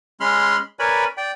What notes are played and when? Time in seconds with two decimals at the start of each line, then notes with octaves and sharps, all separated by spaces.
0.20 G#3 C#4 B5 C6 F6
0.79 A#4 B4 C#5 D5 G#5 B5
1.17 D5 G5